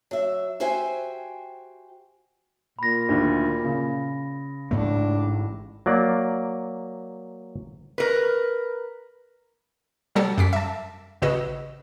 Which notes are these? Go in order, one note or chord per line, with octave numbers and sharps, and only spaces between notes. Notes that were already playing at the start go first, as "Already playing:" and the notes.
F#3 E5
F#4 G4 C5 E5 G5 G#5
A#2 B5 A#6
D2 D3 D#3
C#3
A1 G#2 A3 D4
F#3 A#3 D5
A#4 B4
C3 F#3 G3 A4 A6
F#2 D6 B6
E5 A5
A1 C#3 F#4 B4 D#5 E6